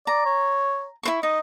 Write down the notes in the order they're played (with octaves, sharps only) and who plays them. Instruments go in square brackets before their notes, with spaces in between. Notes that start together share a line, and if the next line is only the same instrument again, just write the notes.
[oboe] D5 [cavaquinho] A#5
[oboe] C#5
[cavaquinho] E4 C5 C#6
[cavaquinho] D#4 [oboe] D#5